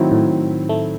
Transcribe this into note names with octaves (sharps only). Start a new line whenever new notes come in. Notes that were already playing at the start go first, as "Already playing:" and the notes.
Already playing: A2 D#3 F#3 C4 E4
A2
A3